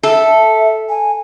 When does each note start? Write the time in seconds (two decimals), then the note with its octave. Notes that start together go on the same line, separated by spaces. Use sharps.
0.03 A4 E5
0.89 G#5